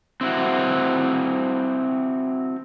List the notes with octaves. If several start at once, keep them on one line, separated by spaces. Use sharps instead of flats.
C4 E4 F#4